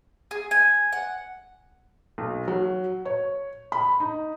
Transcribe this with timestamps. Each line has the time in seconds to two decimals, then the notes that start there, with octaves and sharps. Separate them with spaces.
0.31 G#4
0.51 G#5
0.92 F#5
2.18 B1
2.48 F#3
3.05 C#5
3.72 B5
4.00 D#4